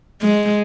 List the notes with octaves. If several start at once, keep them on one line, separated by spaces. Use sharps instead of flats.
G#3